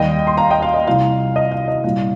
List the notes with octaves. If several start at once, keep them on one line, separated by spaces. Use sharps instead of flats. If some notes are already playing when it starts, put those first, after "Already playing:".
Already playing: D#2 D#3 G3 D#5 G5
C6
F5 A#5
D#5 G5
F5
D#5
C2 C3 F3 F5
D#5
F5
D#5
C2 A#2 G3 F5